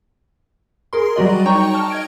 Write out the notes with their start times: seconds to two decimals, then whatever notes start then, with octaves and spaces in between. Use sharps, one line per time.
0.93 G#4 A#4 C6
1.16 F#3 G3 F#4 D5 D#5
1.46 D#4 C#5 G5 A#5 C#6
1.73 A5 F6
1.90 D#5 G#6 D7